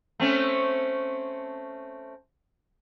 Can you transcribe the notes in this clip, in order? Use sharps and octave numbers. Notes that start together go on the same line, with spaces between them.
A3 C4 C#4